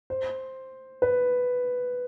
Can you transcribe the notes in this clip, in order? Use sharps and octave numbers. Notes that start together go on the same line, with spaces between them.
C5
B4